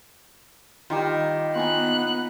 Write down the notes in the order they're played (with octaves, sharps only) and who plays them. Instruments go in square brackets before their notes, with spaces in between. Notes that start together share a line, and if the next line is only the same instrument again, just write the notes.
[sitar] D#3 [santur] G3 F4
[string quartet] B3 F#6 [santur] F4 G#5 A#5